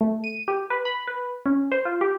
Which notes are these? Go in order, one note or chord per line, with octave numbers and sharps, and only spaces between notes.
A3
D#7
G4
B4
B5
B4
C#4
C5
F4
G4